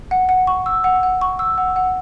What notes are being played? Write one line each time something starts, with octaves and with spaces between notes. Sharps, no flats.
F#5
F#5
C#6
E6
F#5
F#5
C#6
E6
F#5
F#5